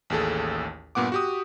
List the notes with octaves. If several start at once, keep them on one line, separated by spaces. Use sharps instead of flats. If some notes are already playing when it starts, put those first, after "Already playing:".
A1 D#2 G#4 A4
G2 A#2 B3 F#5 D6
F#4 G4 D#6